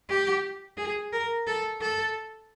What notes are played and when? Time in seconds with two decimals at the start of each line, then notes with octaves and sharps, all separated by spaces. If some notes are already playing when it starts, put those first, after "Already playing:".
0.09 G4
0.77 G#4
1.12 A#4
1.47 A4
1.81 A4